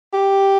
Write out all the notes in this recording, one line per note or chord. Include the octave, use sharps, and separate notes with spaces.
G4